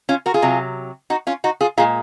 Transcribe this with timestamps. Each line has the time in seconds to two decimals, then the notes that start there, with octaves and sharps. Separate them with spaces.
0.09 C#4 F4
0.26 F#4 A#4
0.34 F4 G#4
0.42 C3 F#3
1.10 D#4 F#4
1.27 C#4 F4
1.44 D#4 F#4
1.61 F4 G#4
1.77 A#2 G#3 F4 G#4